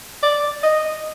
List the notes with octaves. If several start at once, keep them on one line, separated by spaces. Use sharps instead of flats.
D5
D#5